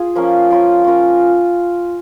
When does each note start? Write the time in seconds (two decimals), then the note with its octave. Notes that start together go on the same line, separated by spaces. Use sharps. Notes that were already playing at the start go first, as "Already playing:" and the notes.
Already playing: F4 G#4
0.15 F3 A#3 C#4
0.51 C#4 F4 A#4
0.84 C#4 F4 A#4